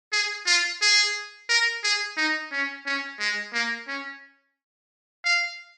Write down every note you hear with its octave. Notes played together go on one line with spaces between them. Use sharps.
G#4
F4
G#4
A#4
G#4
D#4
C#4
C#4
G#3
A#3
C#4
F5